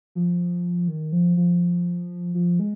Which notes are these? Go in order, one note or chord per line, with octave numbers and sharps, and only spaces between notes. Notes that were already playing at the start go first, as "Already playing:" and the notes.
F3
D#3
F3
F3
F3
G#3